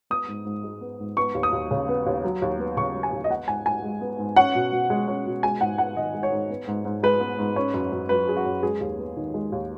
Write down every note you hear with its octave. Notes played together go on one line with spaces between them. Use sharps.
B3 D#6
G#2
G#2
G#3
B3
G#2
B3 C#6
D#2
D#6
D#2
C#3
B3
D#2
F#3
D#2
B3
C#3 C#6
F#3
G#5
D#2
D#5
B3 F#5
G#2 G#5
G#2 G#5
G#3
B3
G#2
C#4 F#5
B2
B2
G#3
C#4
B2
G#3 G#5
G#2 F#5
B3 F#5
D#3 D#5
G#3
C#5
G#2
B3
G#2
G#2
G#3 B4
B3
G#2
C#4
F#2
F#2
F#3 B4
C#4 G#4
F#4
F#2
G#3 G#4
D#2
B3
D#3
G#3
D#2